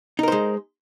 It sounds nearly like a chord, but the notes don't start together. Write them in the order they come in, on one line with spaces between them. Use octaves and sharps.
D#4 A#4 C5 G#3